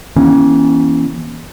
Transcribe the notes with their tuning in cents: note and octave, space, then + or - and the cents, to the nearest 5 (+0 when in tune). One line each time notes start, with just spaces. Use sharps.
E3 +0 A#3 +45 C#4 +0